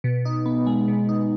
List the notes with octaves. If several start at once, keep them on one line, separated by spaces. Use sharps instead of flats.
B2
D#4
B3
G#3
B2
D#4